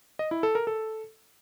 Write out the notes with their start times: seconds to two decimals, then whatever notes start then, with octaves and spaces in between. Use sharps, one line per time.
0.19 D#5
0.31 E4
0.43 A4
0.55 A#4
0.67 A4